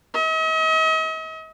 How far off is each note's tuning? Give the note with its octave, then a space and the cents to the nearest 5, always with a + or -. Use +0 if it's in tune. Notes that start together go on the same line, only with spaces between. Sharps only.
D#5 +45